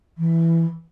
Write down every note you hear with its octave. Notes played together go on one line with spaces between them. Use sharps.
E3